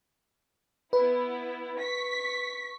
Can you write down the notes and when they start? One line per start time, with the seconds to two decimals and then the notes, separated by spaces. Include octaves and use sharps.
0.93 B3 E4 B4
1.78 C#6 B6